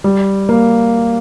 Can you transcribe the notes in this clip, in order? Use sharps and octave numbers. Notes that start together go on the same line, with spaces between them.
G3
A#3